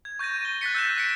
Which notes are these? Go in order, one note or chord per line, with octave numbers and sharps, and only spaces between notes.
G#6
C#6 G6 A6 A#6 D#7
G7
F#6 A6 B6 C#7
E6 F#6 G6 A6 A#6 E7
F#6 B6 C#7 D7